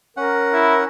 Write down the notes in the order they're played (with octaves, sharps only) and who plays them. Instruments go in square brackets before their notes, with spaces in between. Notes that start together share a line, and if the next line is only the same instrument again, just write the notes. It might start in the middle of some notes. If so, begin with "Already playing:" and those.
[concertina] C#4 F#5 [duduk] A#4
[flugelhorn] E4